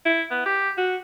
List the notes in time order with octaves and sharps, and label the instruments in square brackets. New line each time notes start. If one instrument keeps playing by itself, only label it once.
[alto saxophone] E4
B3
G4
F#4